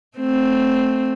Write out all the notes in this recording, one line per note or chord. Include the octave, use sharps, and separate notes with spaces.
A3 C4